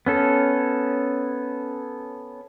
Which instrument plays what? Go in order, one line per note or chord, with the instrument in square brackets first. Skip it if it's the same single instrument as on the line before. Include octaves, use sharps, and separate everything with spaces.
[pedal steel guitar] B3 C#4 A4